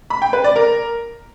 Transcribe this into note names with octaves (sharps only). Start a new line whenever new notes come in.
B5
G5
B4
D5
A#4